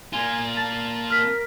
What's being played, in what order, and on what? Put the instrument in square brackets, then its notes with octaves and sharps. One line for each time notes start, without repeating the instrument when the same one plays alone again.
[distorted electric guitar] A#3 F4 [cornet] G#5 [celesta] G7
[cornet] A5 [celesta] A6
[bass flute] A#4 [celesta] F6 B6